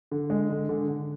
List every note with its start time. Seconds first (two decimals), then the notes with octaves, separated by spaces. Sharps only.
0.11 D3
0.30 G#3
0.50 D3
0.69 D3
0.88 D3